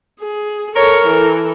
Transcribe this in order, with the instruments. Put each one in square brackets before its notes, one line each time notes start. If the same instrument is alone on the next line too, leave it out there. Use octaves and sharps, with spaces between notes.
[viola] G#4
[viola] A4 C#5 [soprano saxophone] A#4
[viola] E3 A4